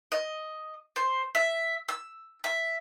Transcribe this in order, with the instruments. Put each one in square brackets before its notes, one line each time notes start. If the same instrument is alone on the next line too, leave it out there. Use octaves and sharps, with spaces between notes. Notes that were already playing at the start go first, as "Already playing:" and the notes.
[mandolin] D#5
C5
E5
E6
E5